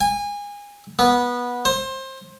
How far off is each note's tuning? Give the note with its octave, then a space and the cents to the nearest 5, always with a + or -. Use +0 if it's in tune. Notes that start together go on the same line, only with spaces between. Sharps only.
G#5 -25
B3 -15
C5 +25